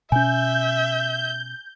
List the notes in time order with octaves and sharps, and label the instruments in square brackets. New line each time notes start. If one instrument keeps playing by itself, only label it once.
[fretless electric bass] B2 C#4 [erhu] E5 [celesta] G#5 [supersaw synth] G6